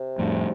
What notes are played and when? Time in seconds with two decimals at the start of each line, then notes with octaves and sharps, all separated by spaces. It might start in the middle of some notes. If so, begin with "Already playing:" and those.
Already playing: C3
0.19 F2 A2